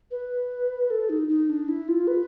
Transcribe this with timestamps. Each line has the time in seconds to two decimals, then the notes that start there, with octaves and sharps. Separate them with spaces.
0.11 B4
0.90 A4
1.09 D#4
1.29 D#4
1.49 D4
1.68 E4
1.88 F4
2.07 B4